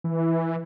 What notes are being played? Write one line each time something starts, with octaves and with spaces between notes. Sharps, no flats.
E3